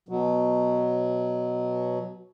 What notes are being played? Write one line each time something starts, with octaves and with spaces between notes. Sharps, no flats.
B2 F#3